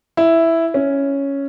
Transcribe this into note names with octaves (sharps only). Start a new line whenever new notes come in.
E4
C#4